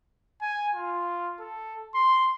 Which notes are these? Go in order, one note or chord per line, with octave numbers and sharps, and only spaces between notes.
G#5
F4
A4
C6